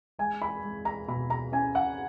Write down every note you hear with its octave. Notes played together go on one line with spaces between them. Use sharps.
G#3 G#5
B5
G#3
A#5
B2 B5
A#5
C#4 G#5
F#5